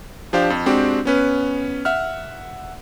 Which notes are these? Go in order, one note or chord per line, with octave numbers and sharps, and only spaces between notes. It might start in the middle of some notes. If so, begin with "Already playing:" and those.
F3 D4 G4 C5 F5
F2
G#3 C4 D4 F#4 G4
B3 C#4 B4
E5 F#5 F6